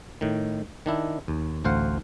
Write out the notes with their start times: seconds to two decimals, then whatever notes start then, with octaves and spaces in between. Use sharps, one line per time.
0.21 A2 D#3
0.86 D#3 D4 E4
1.28 D#2
1.64 A1 D2 C5 F5 F#5